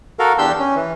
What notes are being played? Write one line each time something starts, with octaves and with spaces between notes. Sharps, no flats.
F#4 A4 A#4 F5
E2 D4 G4 C6 E6 G6
C#4
E3